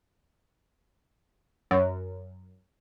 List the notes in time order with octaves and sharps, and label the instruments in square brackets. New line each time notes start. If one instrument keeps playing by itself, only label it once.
[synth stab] F#2